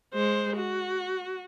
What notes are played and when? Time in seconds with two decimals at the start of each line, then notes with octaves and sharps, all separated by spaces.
0.14 G#3 C5
0.56 F#4